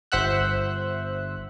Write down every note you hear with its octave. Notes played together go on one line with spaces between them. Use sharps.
G1 C5 E5 F#5 E6 F#6